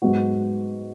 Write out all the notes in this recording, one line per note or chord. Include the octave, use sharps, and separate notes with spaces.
G#2 F#3 B3 F#4